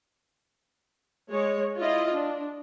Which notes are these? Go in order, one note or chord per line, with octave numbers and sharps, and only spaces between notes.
G#3 C#5
E4 F4 D#5
D4